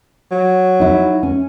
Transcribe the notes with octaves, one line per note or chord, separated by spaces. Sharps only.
F#3
D#4 E4
C#4